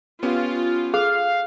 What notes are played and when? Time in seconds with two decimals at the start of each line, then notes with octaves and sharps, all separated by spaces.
0.23 B3 C#4 F4 G4
0.94 G#4 A4 F5 F#6